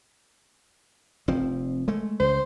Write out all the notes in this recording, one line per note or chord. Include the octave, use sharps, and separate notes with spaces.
F1 F3 C4
G#3 A3
C#2 C5